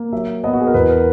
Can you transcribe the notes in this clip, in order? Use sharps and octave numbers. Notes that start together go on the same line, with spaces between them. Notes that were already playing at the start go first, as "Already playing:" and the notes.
Already playing: A#3
F#3 E5
B3 D#5
F#4
G#4
A#4
E2 B4
A#4